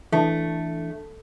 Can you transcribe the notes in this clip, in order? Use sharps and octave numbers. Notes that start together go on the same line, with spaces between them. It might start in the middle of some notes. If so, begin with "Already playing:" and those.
E3 A3 D4